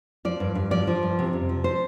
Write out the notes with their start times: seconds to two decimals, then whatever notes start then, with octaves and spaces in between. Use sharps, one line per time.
0.25 F3 D5
0.40 G2
0.55 G2
0.71 F3 D5
0.87 F3
1.03 G2
1.19 C3
1.33 F2
1.49 F3
1.64 C5